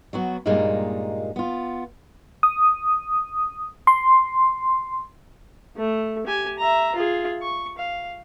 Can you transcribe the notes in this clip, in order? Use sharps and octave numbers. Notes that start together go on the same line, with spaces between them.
F#3 B3 F#4
G2 A#2 G3 G#3 A#3 D#4
B3 F4
D#6
C6
A3
G4 G#5
E5 A#5
F4 G#4
C#6
F5